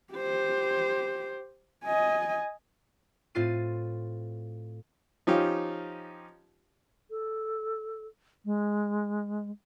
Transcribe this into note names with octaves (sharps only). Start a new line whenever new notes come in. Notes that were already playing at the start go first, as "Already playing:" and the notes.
G4 C5
D#5 G#5
A2 C4 F4 A6 C7 D#7
F3 C#4 D#4 F4 G4
A4
G#3